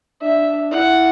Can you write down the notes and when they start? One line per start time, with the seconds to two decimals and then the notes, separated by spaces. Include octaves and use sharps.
0.21 D4 E5
0.72 E4 F#5